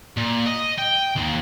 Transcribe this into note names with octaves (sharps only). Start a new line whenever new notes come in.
A#2
D#5
G5
D#2